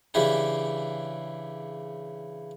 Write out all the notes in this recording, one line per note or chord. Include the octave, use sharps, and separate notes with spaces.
C#3 E3 D4 E4 G4 G#4